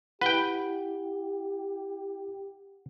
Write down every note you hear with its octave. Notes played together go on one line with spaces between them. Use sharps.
E4 G4 B4 F#5 G5 G7